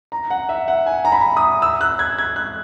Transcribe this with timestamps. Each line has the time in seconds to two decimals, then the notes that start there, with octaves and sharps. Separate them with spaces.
0.12 A#5
0.30 F#5
0.49 E5
0.68 F#5
0.86 G#5
1.05 A#5
1.12 B5
1.37 D#6
1.62 E6
1.81 F#6
1.99 G#6
2.18 G#6
2.36 F#6